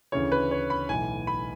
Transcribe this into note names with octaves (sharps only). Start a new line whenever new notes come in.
D2 C#3 E3 C#5
B4
C#5
B5
B1 A2 E3 G#5
B5